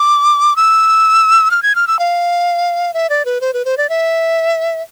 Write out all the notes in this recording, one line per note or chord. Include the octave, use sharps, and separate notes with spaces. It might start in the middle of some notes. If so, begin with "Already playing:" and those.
Already playing: D6
E6
F6
G#6
F6
E6
F5
E5
D5
B4
C5
B4
C5
D5
E5